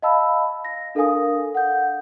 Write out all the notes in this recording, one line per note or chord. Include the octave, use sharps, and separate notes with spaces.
D#5 F5 A5 B5 E6
A#6
D4 A4 A#4 F5 G#5 D#6
F#5 G6